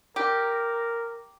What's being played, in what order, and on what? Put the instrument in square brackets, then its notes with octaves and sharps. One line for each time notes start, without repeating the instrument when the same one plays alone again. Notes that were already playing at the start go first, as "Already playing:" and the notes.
[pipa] G4 [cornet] A#4